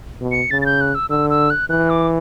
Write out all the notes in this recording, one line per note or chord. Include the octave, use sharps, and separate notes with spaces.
B2
C#7
C#3 A6
A6
G6
F#6
E6
D3 E6
E6
F#6
E3 F#6
D6